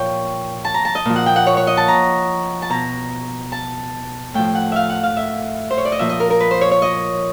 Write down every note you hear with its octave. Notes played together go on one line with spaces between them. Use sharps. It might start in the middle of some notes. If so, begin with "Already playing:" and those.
Already playing: A#2 F3 C#5 G5
A5
A#5
A5
D#5
A#2 F3
F#5
G5
F#5
C#5
C#5
D#5
A5
A#5
A5
B2 A#5
A5
A2 F3 G5
F#5
E5 F5
F#5
F5
E5
C5
C#5
D5
D#5
A#2 F3 E5
D#5
A#4
A#4
B4
C5
C#5
C#5
D#5